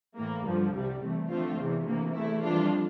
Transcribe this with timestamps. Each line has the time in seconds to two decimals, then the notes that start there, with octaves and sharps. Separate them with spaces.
0.16 A2 E3 A#3
0.45 G2 D3 F3
0.73 C2 C3 G3
1.02 C3 E3 A3
1.29 D3 F3 A3 C4 F4
1.58 E2 C3 E3
1.85 D2 C3 E3 A#3
2.14 E2 E3 A3 E4
2.43 F2 E3 G3 D4 F4